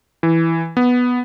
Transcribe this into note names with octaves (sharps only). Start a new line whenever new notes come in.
E3
B3